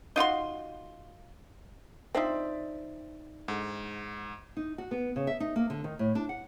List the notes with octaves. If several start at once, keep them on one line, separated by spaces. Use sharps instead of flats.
D#4 F4 F#4 C6
C4 D4 D#4 F4 C5 D5 E5
G#2 D3
D#4
F#4
B3
C#3
E5
D#4
A#3
D3
D#3
A2
D4
F#5